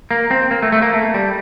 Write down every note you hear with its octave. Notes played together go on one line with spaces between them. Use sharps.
A#3
C4
A#3
A3
A3
A#3
A3
G3